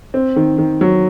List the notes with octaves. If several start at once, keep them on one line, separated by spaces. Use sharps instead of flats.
C4
D#3
D#3
F#3